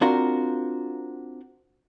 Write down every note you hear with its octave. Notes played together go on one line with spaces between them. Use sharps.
C4 D4 F4 F#4 A#4